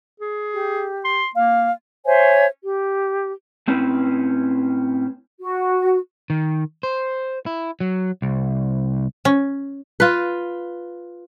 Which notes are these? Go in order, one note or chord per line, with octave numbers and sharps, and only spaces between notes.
G#4
G4
C6
A#3 F5
C5 C#5 E5 G#5
G4
A2 C4 C#4 E4 B4
F#4
D#3
C5
E4
F#3
C2
C#4
F4 B4